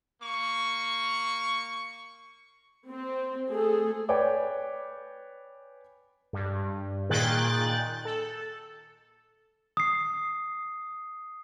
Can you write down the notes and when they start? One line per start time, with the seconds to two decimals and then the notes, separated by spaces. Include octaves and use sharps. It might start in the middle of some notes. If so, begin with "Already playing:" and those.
0.22 A#3 C#6
2.90 C4
3.50 A3 G#4 A4
4.09 B4 C#5 D5 G5 G#5 D6
6.33 G2
7.10 A#2 D#3 G#4 G5 F#6 A6
8.05 A4
9.77 D#6 C7